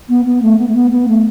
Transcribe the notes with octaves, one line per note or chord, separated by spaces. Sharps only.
B3
B3
A3
B3
A3
B3
B3
A3